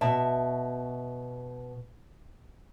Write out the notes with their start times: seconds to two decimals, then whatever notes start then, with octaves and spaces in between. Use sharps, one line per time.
0.01 B2 E5 A5